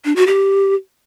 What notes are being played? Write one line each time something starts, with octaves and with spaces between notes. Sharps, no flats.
D4
F#4
G4